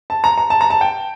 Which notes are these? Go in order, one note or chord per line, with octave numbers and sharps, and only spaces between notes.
A5
A#5
A#5
A5
A#5
A5
G5